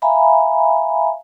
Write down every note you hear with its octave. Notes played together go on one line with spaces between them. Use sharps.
E5 F5 G#5 A#5 B5